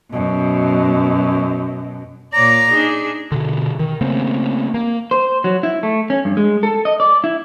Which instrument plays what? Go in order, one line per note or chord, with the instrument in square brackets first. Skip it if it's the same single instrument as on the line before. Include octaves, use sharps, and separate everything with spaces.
[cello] F#2 B2
[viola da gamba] A#2 C#5 D5 [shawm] A#5
[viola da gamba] D4 D#4 G#4
[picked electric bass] B2 D3
D#3
C#3 A3 A#3 C4
A#3
[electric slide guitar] C5
F#3
E4
A3
C#4
G2
G#3
A4
D#5
D5
E4